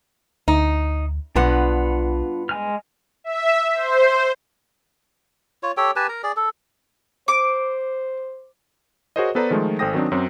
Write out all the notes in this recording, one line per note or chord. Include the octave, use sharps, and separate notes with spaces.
D2 D#4
B1 G2 B3 D4 F4 F#5
G#3 G#5 F6
E5
C5
F4 C#5
G4 A4 C#5 G5
G4 B4 G#5 A5
A#4 A#5
G#4 D5
A4
C5 D6
F#4 G#4 A#4 C5 C#5 D#5
B3 A4 B4 C5 D5 A#5
D#3 F3 G#3 A3 F4
G#1 A4 C5 G5 D#6 A#6
D#3 F#3 C4 D4
F#2 F#3 C4